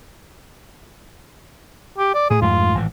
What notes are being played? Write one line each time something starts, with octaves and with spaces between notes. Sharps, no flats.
G4
D5
A2 G#4
F2 G#2 A3 F4
G#1 A2 E3